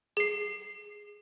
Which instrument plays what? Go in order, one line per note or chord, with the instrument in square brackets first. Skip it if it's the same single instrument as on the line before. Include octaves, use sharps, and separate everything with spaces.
[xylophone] G#4 C7